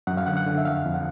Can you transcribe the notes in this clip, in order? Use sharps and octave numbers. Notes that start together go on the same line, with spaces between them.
F#2 F#5
F5
D3 F#5
F#5
D3
E5
F2 F5
F2
F#5